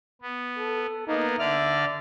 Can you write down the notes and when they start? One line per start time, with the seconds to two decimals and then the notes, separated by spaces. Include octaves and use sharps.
0.22 B3
0.59 A4
1.07 A#3 B3 D#4
1.39 D3 D5 E5 F6